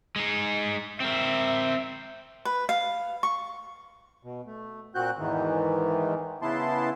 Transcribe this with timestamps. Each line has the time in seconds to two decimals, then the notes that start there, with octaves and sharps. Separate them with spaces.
0.16 G#3 D#4
1.00 C4 A#4 E5
2.45 B4
2.69 F5
3.23 C#6
4.23 B2
4.46 A3
4.95 A#2 C4 F#4 F#6 G6
5.18 E2 G#2 D#3 E3
6.42 C#3 B3 E4 A5 C6